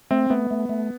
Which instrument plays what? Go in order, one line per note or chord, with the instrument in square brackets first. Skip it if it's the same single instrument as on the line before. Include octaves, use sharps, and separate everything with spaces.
[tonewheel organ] A3 [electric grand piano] C4
[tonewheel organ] A3 [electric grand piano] B3
[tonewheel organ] A3
A3